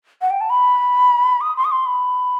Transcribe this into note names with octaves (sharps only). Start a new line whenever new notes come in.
F#5
G5
A5
B5
D#6
C6
D#6
C6
B5